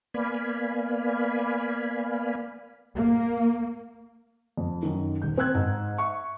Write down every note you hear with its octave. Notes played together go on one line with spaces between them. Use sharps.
A#3 B3 D5 F5 G#5 B5
A#3
F2
F#2 D#3
D#1 G6
C4 G5 E6 F#6 G#6
G#2
E5 C#6